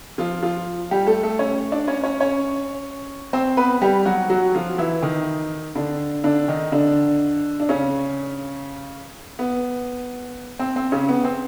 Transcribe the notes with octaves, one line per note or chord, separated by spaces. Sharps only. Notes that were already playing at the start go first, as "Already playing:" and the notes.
F3 F4
F3 F4
G3 G4
A3 A4
A3 A4
C#4 C#5
D4 D5
C#4 C#5
C#4 C#5
C#4 C#5
C4 C5
B3 B4
G3 G4
F#3 F#4
F#3 F#4
F3 F4
E3 E4
D#3 D#4
D3 D4
D3 D4
D#3 D#4
D3 D4
D4
C#3 C#4
B3
C4
C4
C#3 C#4
B3
C4